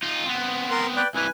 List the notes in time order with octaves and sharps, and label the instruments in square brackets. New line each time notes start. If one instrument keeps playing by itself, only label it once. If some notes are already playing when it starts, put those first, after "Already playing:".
[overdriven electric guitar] D#4 F4
B3 C4
[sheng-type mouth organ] A#4 C6
B4 D5 G5
[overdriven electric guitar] C2 E3 [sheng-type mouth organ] B4 G#5